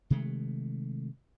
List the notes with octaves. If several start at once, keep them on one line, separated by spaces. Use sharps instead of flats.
C3 D#3 G#3 A3